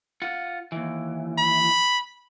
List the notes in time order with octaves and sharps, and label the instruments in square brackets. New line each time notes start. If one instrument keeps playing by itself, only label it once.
[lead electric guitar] F4 F#5
D#2 E3
[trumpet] B5